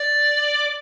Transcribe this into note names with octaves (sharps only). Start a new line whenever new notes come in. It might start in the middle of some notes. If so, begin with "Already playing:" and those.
Already playing: D5